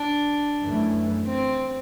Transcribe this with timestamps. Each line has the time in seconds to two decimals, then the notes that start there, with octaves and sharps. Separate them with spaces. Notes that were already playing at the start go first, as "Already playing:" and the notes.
Already playing: D4
0.61 F#2 E3 A3
1.27 C4